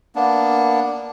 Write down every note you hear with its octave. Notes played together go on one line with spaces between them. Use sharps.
A#3 B3 D4